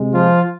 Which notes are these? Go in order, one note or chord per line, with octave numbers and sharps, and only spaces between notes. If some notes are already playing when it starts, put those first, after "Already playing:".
Already playing: C3 G#3
F3 F4